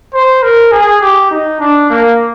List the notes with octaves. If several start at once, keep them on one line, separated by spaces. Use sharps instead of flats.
C5
A#4
G#4
G4
D#4
D4
A#3